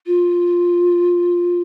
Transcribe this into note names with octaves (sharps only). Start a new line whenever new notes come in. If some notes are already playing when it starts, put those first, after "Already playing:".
F4